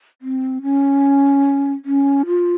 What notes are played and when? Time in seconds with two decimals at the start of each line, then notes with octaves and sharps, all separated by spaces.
0.22 C4
0.62 C#4
1.85 C#4
2.26 F4